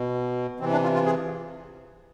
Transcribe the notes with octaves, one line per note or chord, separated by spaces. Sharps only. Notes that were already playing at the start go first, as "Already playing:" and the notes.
Already playing: B2
C3 E3 C4
D4
F4
F4
G#4